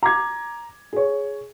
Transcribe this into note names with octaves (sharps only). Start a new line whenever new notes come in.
A#5 D6 G#6
G#4 C#5